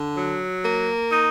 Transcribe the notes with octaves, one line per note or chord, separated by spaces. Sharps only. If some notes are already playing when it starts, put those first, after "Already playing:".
Already playing: D3
F#3
A#3
D#4